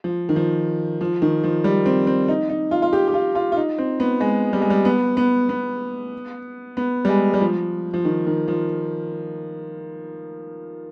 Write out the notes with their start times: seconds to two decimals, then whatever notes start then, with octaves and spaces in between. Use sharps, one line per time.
0.04 F3
0.29 D#3
0.36 F3
1.01 F3
1.22 D#3
1.44 F3
1.64 G3
1.86 C4
2.07 C4
2.28 D#4
2.49 D#4
2.71 F4
2.82 F4
2.93 G4
3.08 G4
3.14 F4
3.35 F4
3.52 F4
3.57 D#4
3.78 C4
4.00 B3
4.20 G#3
4.53 G3
4.62 G#3
4.70 G3
4.85 B3
5.17 B3
5.49 B3
6.77 B3
7.05 G3
7.09 G#3
7.34 G3
7.41 F3
7.94 F3
8.05 D#3
8.27 D#3
8.48 F3